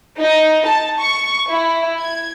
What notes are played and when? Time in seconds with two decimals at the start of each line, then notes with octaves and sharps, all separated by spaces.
0.19 D#4
0.66 A5
0.99 C#6
1.49 E4
1.98 G#6